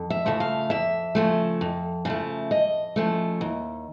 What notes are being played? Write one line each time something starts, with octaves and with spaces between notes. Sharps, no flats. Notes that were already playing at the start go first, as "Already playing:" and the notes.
Already playing: F2
E5
C#3 F3 A3
F5
F2 E5
C#3 F3 A3
F2
C#3 F3 A3
F2 D#5
C#3 F3 A3
D#2